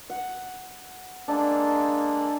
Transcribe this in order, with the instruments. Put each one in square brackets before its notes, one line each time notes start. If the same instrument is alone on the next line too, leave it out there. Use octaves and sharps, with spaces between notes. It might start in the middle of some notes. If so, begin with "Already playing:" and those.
[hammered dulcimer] F#5
[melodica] G#3 A#3 A4 [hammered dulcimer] D4